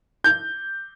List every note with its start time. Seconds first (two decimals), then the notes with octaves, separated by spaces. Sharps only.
0.24 G6